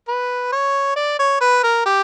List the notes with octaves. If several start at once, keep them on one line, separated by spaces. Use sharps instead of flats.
B4
C#5
D5
C#5
B4
A#4
G4